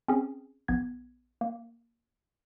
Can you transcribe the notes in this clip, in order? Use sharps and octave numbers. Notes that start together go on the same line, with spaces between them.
C4 C#4 G#4
A#1 B3 G#6
A#3